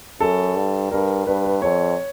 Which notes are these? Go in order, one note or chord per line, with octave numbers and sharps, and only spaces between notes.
F#2 A4
G2
G2 A#4
G2 B4
B4
F2 C#5